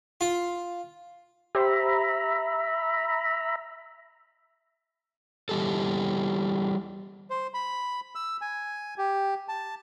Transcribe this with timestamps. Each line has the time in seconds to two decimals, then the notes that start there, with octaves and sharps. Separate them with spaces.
0.21 F4
1.55 G4 C5 E5 A#5 B5
5.49 E3 G3 G4 A4
7.30 C5
7.54 B5
8.15 E6
8.41 G#5
8.98 G4
9.48 A5